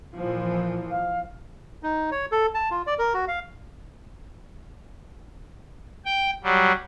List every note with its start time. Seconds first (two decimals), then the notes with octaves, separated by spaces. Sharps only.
0.17 A#2 E3 F3
0.90 F5
1.83 D#4
2.11 C#5
2.32 A4
2.54 A5
2.71 F4
2.87 D5
2.99 A#4
3.14 F#4
3.28 F5
6.05 G5
6.43 F#3 G3